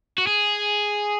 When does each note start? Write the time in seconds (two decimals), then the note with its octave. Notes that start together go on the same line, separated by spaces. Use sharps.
0.18 F#4
0.27 G#4